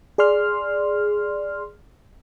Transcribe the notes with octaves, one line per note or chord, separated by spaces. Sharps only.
G#4 D5 C6 F6